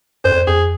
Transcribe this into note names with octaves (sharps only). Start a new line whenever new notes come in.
F#2 C5
F2
F2 G#4